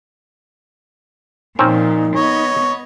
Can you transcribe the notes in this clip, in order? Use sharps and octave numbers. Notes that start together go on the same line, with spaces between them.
A#2 F3 C4 C#4 D#4 A#4
B3 C#5 D#5